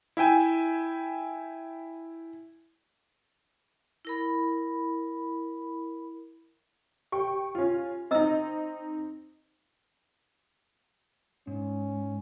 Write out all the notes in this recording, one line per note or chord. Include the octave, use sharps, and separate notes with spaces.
E4 E5 G5 G#5
E4 A#4 B5
G4 G5 C#6
C#4 F4
C4 D#4 D#5 A#5 E6
G#2 C#4